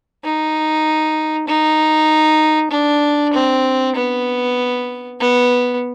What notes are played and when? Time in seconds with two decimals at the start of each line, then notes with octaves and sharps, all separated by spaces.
0.24 D#4
1.47 D#4
2.71 D4
3.33 C4
3.95 B3
5.20 B3